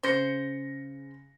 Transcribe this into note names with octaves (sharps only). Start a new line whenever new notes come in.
C#3 C5 A#6 C#7